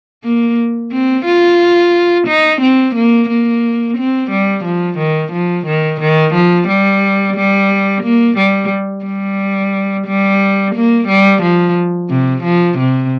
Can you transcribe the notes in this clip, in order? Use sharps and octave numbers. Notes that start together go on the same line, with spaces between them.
A#3
C4
F4
D#4
C4
A#3
A#3
C4
G3
F3
D#3
F3
D#3
D#3
F3
G3
G3
A#3
G3
G3
G3
A#3
G3
F3
C3
F3
C3